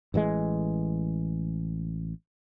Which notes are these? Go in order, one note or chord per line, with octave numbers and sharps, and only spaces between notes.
A1 E3 F#3 G#3